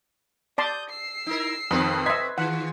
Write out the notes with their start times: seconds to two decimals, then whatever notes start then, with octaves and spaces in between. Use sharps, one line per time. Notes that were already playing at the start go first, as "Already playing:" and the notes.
0.58 D5 A5 C6 D#6 G6
0.90 E6 C7
1.26 D#4 E4 A#4
1.71 F2 B2 D#3 C4 B4
2.06 D#5 E5 C6 G#6 B6
2.38 D#3 F4 G#4 F#5